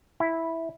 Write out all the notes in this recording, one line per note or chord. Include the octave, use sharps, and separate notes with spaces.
E4